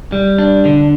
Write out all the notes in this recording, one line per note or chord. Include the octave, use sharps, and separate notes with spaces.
G3
D4
D3